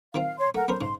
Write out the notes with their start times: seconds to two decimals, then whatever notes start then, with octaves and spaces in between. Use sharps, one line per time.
0.15 D#3 C4 F4 F5
0.38 C#5 C6
0.55 A3 A#4 F#5
0.68 B3 C#4 A#4 C5
0.81 G#2 C#3 C6